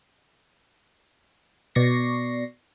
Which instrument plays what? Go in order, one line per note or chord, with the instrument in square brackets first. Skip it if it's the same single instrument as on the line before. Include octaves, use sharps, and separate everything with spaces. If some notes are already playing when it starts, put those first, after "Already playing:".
[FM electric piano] B2 D5 C#6 A#6 C7